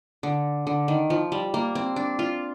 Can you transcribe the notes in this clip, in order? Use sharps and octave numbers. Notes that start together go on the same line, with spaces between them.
D3
D3
D#3
F3
G3
A#3
C4
D4
F4